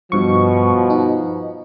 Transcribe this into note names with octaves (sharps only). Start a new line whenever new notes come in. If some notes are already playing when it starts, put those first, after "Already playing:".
G2 B2 F3 C#6
D#4